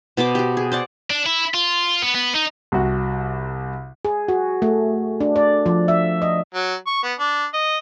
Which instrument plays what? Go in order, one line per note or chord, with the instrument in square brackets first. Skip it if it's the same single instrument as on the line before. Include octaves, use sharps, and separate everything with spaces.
[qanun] B2 B3 C5 D6
F#4 G4
G#4
C5 D5 F#5
[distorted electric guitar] D4
E4
F4
B3
B3
D#4
[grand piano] C2 F#4
[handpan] G#4
F#4
A3
D4
D5
F3
E5
D#5
[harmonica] F#3
C#6
B3
D4
D#5